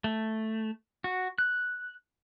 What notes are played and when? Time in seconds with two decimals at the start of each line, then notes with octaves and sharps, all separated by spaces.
0.04 A3
1.04 F#4
1.38 F#6